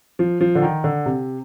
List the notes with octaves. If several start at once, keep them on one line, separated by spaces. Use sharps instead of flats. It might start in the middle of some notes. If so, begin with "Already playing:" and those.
F3
F3
D3
D#3
D3
C3